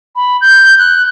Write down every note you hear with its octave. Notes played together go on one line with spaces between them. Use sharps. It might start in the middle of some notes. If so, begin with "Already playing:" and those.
B5
G6
F#6